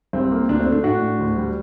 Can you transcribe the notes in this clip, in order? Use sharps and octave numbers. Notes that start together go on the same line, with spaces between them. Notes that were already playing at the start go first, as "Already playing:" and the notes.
C2 C4
A#3
D2 D4
C4
A3
D4
A2 D4 F#4
A2
D2
G3